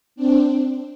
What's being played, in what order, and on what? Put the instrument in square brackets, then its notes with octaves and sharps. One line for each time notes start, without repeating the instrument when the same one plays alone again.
[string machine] C4 D4